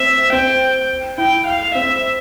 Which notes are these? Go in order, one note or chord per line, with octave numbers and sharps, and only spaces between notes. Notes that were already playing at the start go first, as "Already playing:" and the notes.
Already playing: C4 E5
C4 G5
E4 G5
F5
C4 E5